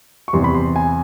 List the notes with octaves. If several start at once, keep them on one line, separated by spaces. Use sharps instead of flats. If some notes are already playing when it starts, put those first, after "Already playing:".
C#6
E2 C3 E3 G3 C6
B5
C6
G#5